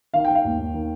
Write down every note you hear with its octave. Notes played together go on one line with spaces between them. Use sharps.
D#3 F5
D#3 G5
F5
D#2
D#2
D#3